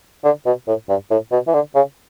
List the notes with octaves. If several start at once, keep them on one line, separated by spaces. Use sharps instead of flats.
D3
B2
A2
G2
A2
B2
E3
D3
C#3